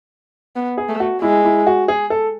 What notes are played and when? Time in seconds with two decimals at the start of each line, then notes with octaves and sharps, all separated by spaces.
0.56 B3
0.78 G#4
0.89 A3
1.00 F#4
1.22 G#3 E4
1.44 E4
1.67 F#4
1.88 G#4
2.10 A4